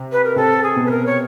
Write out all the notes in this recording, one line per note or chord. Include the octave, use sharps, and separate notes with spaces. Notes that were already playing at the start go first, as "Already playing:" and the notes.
Already playing: C3
B4
A#4
C3 C4 A4
G#4
B2 B3
B4
A#4
C#5